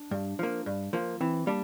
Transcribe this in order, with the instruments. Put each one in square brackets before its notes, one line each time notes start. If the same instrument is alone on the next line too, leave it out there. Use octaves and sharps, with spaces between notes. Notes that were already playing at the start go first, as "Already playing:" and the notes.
Already playing: [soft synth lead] D4
[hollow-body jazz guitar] G2
F3 A#3
G2
F3 A#3
[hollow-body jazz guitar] E3 [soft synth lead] C4
[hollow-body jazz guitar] G3 D4 [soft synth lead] A#3